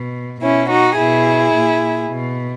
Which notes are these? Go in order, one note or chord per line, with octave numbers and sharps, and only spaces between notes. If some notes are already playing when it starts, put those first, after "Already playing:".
Already playing: B2
B2 C#4 E4
D#4 F#4
B2 E4 G#4
A#2
B2